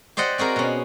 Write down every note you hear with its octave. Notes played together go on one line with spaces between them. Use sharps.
G4 C5 D5 D#5 F#5
C4 F#4 G#4 A#4
B2 C#4